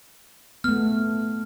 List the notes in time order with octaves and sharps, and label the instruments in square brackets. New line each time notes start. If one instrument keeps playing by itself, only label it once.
[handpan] A3 B3 [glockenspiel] F6